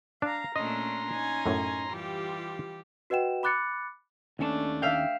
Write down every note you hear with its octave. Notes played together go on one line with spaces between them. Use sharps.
D4 F5 A#5
A#2 A3 C#4 D4 D#5 A#5 C6
C#4 D#4 G#5
F#2 A2
E3 G3 F4 G4
F#4 B4 D#5 F#5 G5 E7
B5 D6 F#6 A6 C#7
D#2 A3 C#4 D4 A5
E5 F5 G5